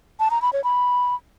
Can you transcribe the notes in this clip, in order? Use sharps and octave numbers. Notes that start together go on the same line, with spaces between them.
A5
A#5
B5
C#5
B5